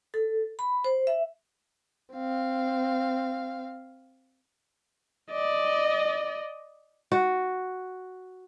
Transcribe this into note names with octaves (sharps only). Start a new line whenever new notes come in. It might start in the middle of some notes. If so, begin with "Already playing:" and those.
A4
B5
C5
E5
C4 F5
D5 D#5
F#4